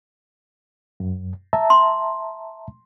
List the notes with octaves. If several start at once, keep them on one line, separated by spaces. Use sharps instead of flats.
F#2
E5 A5 A#5
C6